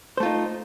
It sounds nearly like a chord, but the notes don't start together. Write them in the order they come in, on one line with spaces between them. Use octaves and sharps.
C5 A3 F4 D#4